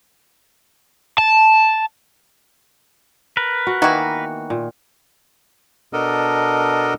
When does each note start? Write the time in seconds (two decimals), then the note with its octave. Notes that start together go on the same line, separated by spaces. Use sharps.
1.18 A5
3.37 A#4 B4
3.67 F#4
3.82 D#3 E3 A#3 B3 F#4
4.50 A#2
5.93 B2 B3 D4 A4 A#4 D#5